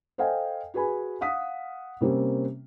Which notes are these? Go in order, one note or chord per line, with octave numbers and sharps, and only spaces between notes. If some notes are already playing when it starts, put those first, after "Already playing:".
A4 C5 D#5 F5 G5 G#5
F#4 G#4 B4 G#5 B5
F5 F#5 D#6 B6
C3 G3 A#3 C4 C#4